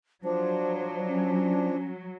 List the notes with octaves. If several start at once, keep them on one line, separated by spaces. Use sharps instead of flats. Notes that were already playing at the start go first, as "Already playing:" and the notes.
F3 F#3 D4 C5
C#4